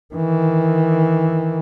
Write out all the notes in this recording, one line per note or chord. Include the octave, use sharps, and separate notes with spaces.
D#3 E3